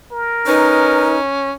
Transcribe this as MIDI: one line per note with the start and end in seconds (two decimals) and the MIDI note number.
0.12 1.26 70
0.47 1.52 61
0.47 1.18 63
0.47 1.15 71